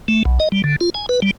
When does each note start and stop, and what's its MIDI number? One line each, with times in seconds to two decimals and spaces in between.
0.08 0.23 57
0.25 0.39 35
0.40 0.49 75
0.52 0.62 55
0.64 0.76 50
0.81 0.90 65
0.95 1.06 80
1.09 1.20 71
1.22 1.31 55